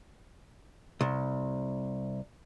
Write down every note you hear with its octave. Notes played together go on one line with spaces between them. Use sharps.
C2